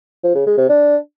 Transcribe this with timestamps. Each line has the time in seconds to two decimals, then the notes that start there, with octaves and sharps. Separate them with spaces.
0.24 F3
0.35 C#3
0.47 G#3
0.58 C3
0.69 D4